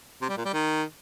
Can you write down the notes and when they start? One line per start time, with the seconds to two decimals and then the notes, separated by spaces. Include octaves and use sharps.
0.22 C3
0.29 G3
0.37 A#2
0.45 G3
0.53 D#3